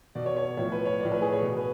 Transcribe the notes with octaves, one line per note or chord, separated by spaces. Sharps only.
B2 D5
C#5
C#5
A2 F3 C#5
B4
C#5
A2 F3 D5
B4
G#4
C#5
B2
B4